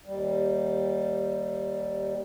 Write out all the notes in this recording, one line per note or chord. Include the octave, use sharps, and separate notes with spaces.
D#2 G3